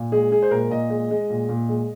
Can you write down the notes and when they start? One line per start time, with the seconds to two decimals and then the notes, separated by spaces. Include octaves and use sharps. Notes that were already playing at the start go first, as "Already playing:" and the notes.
Already playing: A#2
0.12 G#3 G#4
0.31 G#3 G#4
0.42 C5
0.51 A#2 A#4
0.71 A#2 D#5
0.90 G#3
1.11 G#3
1.30 A#2
1.49 A#2
1.69 G#3